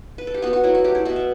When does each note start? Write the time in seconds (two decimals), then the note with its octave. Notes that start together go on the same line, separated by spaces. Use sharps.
0.18 B4
0.27 A4
0.34 G4
0.42 B3 F#4
0.53 F#4
0.64 F#3 E4
0.75 F#4
0.84 A3 G4
0.95 E4
1.05 B2 F#4
1.16 E5